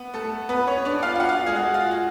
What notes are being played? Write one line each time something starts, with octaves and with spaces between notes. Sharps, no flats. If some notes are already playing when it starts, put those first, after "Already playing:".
Already playing: B3
A3 A4
B3 B4
C#4 C#5
D4 D5
F4 F5
F5
F#4 F#5
F4 F5
G#3 G#4
F#4
F4
F#4